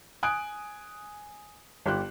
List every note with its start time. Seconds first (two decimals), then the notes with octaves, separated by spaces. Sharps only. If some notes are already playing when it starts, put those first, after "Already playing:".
0.23 G#5 D#6 F#6 D7
1.86 G1 G4 F#6